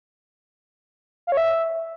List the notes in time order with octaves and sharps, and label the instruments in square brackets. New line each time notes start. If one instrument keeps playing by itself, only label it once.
[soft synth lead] F5
C#5
E5